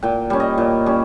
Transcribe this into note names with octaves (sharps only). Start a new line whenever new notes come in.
A#2 G5
G3 C#4
D#5
A#2
G3 C#4